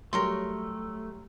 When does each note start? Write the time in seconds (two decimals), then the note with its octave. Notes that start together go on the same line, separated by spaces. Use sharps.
0.13 F#3 G3 A3 G4 A#4 C#5 C6